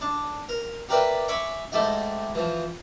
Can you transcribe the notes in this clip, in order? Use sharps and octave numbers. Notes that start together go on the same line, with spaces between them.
D4
A#4
G4 A#4 B4 D5 E5 G5
C#5 E5 G#5 B5 C#6 D6
G#2 A3 E4 G4 D#5
E3 F3